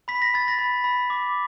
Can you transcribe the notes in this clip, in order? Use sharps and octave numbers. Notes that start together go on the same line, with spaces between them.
B5 B6
A#6
B5 A6
A#6
B5
B5
D6